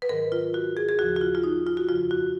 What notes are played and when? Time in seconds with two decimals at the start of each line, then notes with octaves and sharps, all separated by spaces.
0.02 B4
0.09 G#2 D#3 F#3 A#4
0.32 F4
0.54 F#4
0.77 G#4
0.89 G#4
0.99 D#2 C#3 F3 F#4
1.16 F#4
1.21 F4
1.35 F4
1.44 D#4
1.67 F4
1.77 F#4
1.88 F2 C#3 F3 F4
2.11 F#4